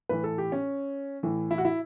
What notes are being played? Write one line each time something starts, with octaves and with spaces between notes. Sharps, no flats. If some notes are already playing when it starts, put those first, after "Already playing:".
A2 E3 B4
A4
G4
C#4
A2 E3
E4
F#4
E4